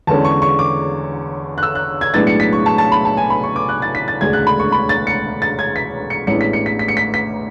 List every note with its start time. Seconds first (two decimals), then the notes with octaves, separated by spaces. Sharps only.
0.07 E2 D3 G#3 C#4 A5
0.25 C#6
0.42 C#6
0.59 D6
1.58 F#6
1.63 E6
1.75 F#6
2.01 G#6
2.14 B1 A2 G#3 B3 D4 A6
2.27 C#7
2.40 B6
2.53 C#6
2.66 A5
2.78 A5
2.92 B5
3.05 A5
3.17 G#5
3.30 B5
3.43 C#6
3.56 D6
3.69 F#6
3.82 A6
3.95 B6
4.08 A6
4.21 E1 D2 C#3 G#3 D4 G#6
4.33 F#6
4.47 B5
4.59 C#6
4.72 B5
4.89 A6
5.07 C#7
5.42 A6
5.59 G#6
5.76 B6
6.10 C#7
6.27 A1 A2 G#3 B3 D4 C#7
6.41 B6
6.53 C#7
6.66 B6
6.79 B6
6.88 C#7
6.97 B6
7.14 B6